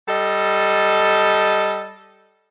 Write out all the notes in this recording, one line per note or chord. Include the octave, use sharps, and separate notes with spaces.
G3 A4 D#5